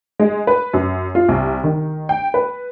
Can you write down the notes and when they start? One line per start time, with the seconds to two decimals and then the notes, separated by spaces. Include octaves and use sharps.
0.20 G#3
0.47 B4
0.74 F#2
1.15 F4
1.29 C2
1.64 D#3
2.09 G5
2.34 B4